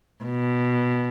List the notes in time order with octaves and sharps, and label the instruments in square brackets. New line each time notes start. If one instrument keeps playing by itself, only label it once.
[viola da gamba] B2